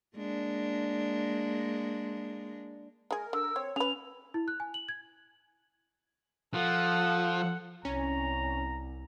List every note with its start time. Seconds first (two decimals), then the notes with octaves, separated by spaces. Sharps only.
0.16 G#3 A#3 D4
3.11 G#3 G#4 A#4
3.33 D3 A#4 E6
3.56 C4 C#5
3.76 C#4 G#4 B4 F7
4.34 E4
4.48 F#6
4.60 G#5
4.74 F#7
4.89 G#6
6.54 F3 A4 F#5
7.85 C2 C#4 A#5